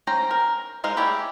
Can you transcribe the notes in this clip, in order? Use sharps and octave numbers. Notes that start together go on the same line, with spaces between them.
C#4 C5 G5 A#5
A#4
G#3 D#4 A#4 C5 F5
E4 G4 G#4 C#5 D5